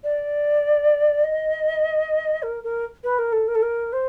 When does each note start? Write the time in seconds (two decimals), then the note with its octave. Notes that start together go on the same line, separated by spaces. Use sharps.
0.04 D5
1.24 D#5
2.43 A#4
2.64 A#4
3.04 B4
3.19 A#4
3.32 A4
3.48 A#4
3.55 A4
3.62 A#4
3.93 C5